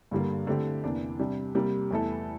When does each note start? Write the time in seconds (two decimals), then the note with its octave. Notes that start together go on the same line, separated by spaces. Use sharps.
0.11 G2 D3 G3 A#3
0.47 D3 A3 C4 E4 G4
0.84 E2 C3 E3 A#3 D4
1.19 C3 G3 D4
1.55 C3 G3 A#3
1.91 E2 E3 A3 E4 A4